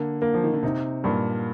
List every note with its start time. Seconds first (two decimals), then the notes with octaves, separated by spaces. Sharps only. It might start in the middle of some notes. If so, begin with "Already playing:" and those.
Already playing: D3 A#3
0.22 A#3
0.34 F3
0.44 D#3
0.53 D3
0.63 C3 D#4
1.04 G2 A#2